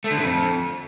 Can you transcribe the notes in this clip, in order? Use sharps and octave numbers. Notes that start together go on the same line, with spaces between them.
A3
D3
A2
F2